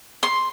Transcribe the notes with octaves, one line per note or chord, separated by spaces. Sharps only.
C6